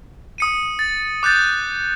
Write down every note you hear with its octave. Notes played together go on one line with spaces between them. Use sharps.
D#6 C#7 D#7
A6
D6 F#6 G6 A6